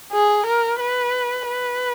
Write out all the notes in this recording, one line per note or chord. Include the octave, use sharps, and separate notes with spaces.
G#4
A#4
B4
B4